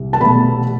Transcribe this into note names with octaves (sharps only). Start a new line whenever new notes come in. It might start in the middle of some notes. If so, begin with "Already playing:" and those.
Already playing: C2
A5
B2 A3 B5